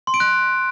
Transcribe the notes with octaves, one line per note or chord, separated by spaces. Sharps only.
C6
D7
F#6